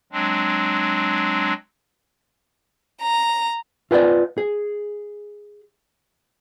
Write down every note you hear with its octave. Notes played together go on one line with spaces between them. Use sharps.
F#3 G#3 C4 D4
A#5
F4 B4 C5 D5 D#5
G#4